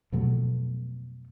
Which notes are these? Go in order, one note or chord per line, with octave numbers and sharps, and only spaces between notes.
F2 B2 F#3 A3